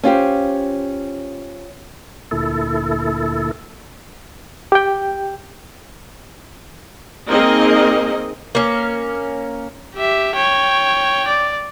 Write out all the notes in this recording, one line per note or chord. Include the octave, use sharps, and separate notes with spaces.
C#4 F4 G4 C5
D2 A#2 E4 A4
G4 G5
A#3 C4 D#4 G#4 A#4 D#5
A#3 C#4
G4 E5
C#5 G5
D5